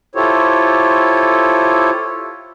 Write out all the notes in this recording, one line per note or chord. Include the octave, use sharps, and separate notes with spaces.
E4 F4 G4 A4 C5 C#5